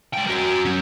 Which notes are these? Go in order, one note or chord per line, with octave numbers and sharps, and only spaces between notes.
G#3 G5
F#4 A#4
F#3 C#4